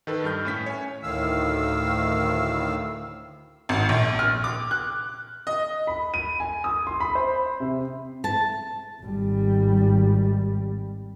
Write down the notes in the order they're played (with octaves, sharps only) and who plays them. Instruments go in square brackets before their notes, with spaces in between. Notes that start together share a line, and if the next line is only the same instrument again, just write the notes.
[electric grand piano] D#3 A4 B4
G2 F6 G6
A2 C#4 B6
C#5 G#5
[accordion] D2 A2 D#3 F5 E6
[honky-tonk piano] G#1
A#1
F6
D6
F#6
D#5
[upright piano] B5
D#7
G#5
D#6
C6
B5
C5
C3
[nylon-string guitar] A5
[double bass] G#1 G3